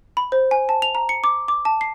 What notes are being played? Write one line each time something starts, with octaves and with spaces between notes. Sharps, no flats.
B5
C5
G#5
A5
F7
A#5
C#7
D6
D6
A5
C7